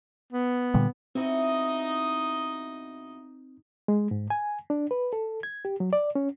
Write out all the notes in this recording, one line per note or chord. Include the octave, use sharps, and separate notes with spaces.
B3
A#2 D3 G3
E2 C4 D#4 E4 F#4 D#5
G#3
G#2
G#5
D4
B4
A4
G#6
G4
F#3
D5
C#4